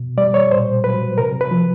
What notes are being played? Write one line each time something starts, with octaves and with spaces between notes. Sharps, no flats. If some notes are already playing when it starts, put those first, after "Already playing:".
Already playing: B2
G3 D5
C#5
A#2 C5
F#3 B4
C3 A#4
B4
F3